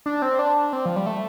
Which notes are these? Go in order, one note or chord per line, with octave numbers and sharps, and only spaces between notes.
D4
C4
D4
D4
C4
F3
G3
A3